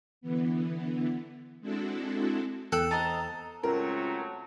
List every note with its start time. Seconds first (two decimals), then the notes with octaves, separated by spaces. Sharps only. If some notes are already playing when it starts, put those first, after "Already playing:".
0.21 D3 E3 B3
1.61 G#3 C4 D4 E4 F#4 A4
2.72 E2 A4 G5 E6 F#6
2.91 C5 D#5 A5 A#5
3.63 C#2 F#3 A3 C4 A#4